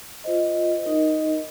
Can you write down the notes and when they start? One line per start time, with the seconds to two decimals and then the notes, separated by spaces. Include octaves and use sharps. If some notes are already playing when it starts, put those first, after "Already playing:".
0.24 F4 C5 D#5
0.82 D#4 A#4 D#5